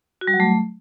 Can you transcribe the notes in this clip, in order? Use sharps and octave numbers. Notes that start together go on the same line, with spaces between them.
F#4
G3
F#3
A3